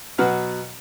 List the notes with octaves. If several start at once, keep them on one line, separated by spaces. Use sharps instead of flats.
B2 F#3 B4 F#5 F6